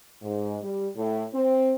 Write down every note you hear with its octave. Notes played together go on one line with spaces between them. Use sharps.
G#2
G3
A2
C4